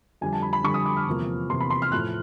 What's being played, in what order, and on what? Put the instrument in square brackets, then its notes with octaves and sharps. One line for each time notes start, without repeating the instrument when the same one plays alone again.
[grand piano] F2 D3 G3 G#5
A5
B5
B5
F2 D3 G3 C#6
D#6
D6
F6
E2 C3 F3 A#3
E2 C3 F3 A#3 C6
B5
C6
F6
A2 F3 A3 F#6